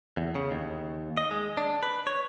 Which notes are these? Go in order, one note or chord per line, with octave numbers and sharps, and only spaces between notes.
E2
C#3
D#2
D#5
G#3
D4
B4
C#5